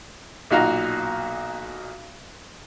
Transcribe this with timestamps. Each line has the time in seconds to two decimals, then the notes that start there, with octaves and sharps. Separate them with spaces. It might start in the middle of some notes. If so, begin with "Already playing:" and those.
0.51 B1 A#2 D#4 F#4 F5 A#5